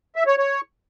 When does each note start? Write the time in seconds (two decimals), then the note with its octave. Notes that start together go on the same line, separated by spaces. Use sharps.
0.16 E5
0.27 C#5
0.38 C#5